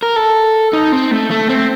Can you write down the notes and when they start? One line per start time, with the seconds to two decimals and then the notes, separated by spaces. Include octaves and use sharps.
0.02 A#4
0.16 A4
0.73 D#4
0.92 C4
1.11 A3
1.30 A3
1.49 C4